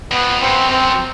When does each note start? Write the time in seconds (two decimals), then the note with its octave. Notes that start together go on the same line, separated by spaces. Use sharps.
0.11 F2 B3
0.41 G2 C4
0.56 F#2
0.70 C4